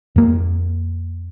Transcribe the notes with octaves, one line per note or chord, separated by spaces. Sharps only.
F2 A#3